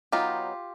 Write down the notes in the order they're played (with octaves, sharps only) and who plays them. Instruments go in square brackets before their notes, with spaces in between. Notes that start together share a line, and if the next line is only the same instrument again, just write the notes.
[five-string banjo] F#3 B3 D#4 F4 G4